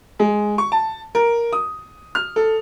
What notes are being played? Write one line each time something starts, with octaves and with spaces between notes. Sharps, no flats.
G#3
C#6
A5
A#4
D#6
F6
A4